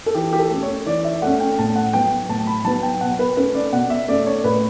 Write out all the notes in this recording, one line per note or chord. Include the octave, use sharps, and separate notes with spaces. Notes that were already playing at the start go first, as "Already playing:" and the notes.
A4
E3 G4
G4
A4
A3 C#4
C#5
E3 D5
E5
A3 C#4 F#5
G5
A2 A5
F#5
F#3 B3 G5
A2 A5
B5
F#3 B3 A5
G5
B2 F#5
B4
A3 C#4 B4
D5
B2 F#5
E5
A3 C#4 D5
C#5
A2 B4